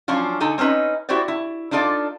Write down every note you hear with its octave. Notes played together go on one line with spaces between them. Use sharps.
F3 F#3 C#4 D4 F4
D3 D#4 A4 G#5
C4 C#4 D#4 B4 D#5
E4 F#4 G4 C5 D5
E4
D4 D#4 F4 A4 D5